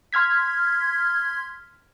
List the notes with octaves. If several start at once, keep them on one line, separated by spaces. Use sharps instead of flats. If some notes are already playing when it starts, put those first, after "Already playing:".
C6 F6 G#6 B6